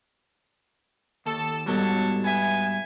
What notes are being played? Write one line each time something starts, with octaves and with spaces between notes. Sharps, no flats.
D#2 A4
G#2 B2 F#3 G3 A4
B3 E5 G#5